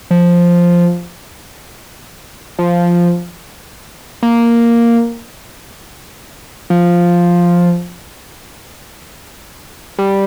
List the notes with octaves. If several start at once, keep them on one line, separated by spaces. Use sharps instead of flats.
F3
F3
A#3
F3
G3